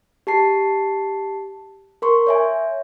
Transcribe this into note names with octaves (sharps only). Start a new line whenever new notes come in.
G4 A5 C7
A#4 C6 C#6
C#5 E5 G#5